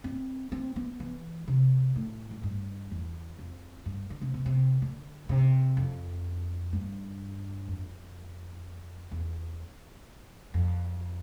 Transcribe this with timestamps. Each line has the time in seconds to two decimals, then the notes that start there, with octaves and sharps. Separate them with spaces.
0.04 C4
0.52 C4
0.76 B3
1.00 E3
1.48 C3
1.96 A2
2.31 A2
2.43 G2
2.91 E2
3.39 F2
3.86 G2
4.10 D3
4.21 C3
4.34 B2
4.46 C3
4.82 D3
5.29 C3
5.77 F2
6.73 G2
7.68 F2
9.11 E2
10.54 F2